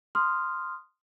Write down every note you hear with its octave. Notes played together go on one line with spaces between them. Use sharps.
C6 D#6 F6